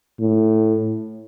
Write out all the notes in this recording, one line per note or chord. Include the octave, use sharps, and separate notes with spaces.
A2